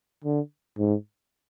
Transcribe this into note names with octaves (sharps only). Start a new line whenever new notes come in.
D3
G#2